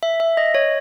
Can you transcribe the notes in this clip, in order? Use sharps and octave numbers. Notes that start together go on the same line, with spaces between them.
E5
E5
D#5
C#5